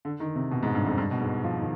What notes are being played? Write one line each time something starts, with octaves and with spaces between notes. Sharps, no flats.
D3
D#3
C3
B2
G#2
G2
F2
G2
B2
G#2
F3
D#3